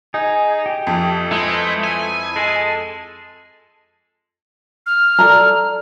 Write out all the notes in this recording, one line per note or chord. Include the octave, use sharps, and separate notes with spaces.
D#4 G#4
G4
F2 A3
G#3 E4 B4 C5
G#5
G#3 A4
F6
A4 D5 A#5